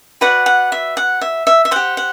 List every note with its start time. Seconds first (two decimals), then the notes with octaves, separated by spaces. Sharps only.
0.21 F#4 B4 D5 F#5
0.46 F#5
0.72 E5
0.97 F#5
1.21 E5
1.47 E5
1.65 E5
1.71 G4 C5 F#5
1.97 F#5